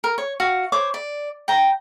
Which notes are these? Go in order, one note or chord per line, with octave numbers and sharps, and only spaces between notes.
A#4
C#5
F#4 F5
C5 C#5 D6
D5
G5 A#5